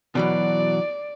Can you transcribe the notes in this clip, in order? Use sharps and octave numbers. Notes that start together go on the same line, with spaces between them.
B2 E3 F#3 D5